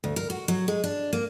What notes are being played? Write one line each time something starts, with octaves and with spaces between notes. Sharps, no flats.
D2
A#4
F#4
F#3
G#3
D4
A#3